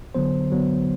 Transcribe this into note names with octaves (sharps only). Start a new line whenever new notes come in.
D3 F#3 B3 C5
D3 F#3 B3